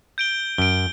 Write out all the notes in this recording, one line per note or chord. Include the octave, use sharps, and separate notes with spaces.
G6 D7 G7
F#2 D7 G7